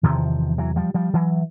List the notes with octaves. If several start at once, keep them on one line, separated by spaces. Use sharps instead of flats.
E2 C3 D#3 F3
E3 F#3
F3 G3
F3 G3
E3 F#3